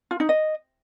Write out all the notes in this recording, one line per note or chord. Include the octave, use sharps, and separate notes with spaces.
F4
D#4
D#5